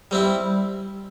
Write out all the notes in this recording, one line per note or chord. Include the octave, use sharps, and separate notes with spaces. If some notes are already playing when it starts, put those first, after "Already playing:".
G3 C4 E4